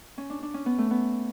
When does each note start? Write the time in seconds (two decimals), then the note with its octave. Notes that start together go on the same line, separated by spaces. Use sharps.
0.18 C#4
0.30 D4
0.42 D4
0.54 C#4
0.66 B3
0.78 A3
0.91 B3